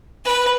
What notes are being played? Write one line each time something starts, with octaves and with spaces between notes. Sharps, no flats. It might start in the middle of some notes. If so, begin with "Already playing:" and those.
B4